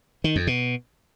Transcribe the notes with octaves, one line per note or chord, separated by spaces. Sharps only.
D#3
F2
B2